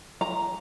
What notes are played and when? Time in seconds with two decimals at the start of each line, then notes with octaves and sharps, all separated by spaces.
0.21 A#5